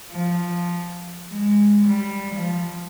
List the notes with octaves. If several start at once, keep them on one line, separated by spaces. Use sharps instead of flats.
F3
G#3
G3
F3